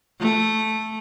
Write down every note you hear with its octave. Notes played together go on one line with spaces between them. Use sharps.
A3